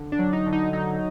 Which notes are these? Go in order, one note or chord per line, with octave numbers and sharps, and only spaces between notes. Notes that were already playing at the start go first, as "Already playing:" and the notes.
Already playing: D3
D4
F#3
D#4
D3
D#4
F#3 D#4